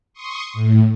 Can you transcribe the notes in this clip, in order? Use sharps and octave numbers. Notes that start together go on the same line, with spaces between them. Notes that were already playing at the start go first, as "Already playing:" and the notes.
C6 C#6 D#6
A2